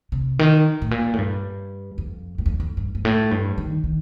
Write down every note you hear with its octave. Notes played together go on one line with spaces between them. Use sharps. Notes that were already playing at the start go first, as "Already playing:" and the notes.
C3
D#3
A2
A#2
A2
G2
F2
G2
F2
F2
G2
G2
A2
G2
D#3
D#3